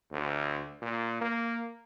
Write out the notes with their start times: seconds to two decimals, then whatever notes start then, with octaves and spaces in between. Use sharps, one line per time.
0.12 D2
0.82 A#2
1.21 A#3